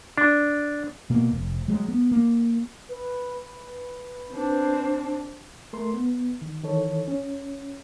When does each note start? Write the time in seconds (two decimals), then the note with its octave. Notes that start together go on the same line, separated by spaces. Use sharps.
0.18 D4
1.10 B2 A#3
1.31 F1
1.68 F#3 G#3
1.88 B3
2.11 A#3
2.89 B4
3.42 B4
4.31 C4 D4
5.73 A3 A#4 C6
5.93 B3
6.42 D#3
6.64 D#3 E3 A4 C#5
7.08 C#4